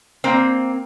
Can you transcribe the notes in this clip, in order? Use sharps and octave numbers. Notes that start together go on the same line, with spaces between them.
A#3 C4